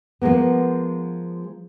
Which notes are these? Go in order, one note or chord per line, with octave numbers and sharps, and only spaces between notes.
F3 G#3 A#3 B3